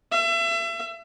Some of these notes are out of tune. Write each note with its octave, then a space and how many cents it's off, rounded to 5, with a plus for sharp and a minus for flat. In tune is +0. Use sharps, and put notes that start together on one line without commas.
E5 +35